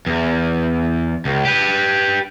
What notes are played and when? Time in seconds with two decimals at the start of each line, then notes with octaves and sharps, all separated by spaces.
0.06 E2
1.25 C#2
1.45 G4 B4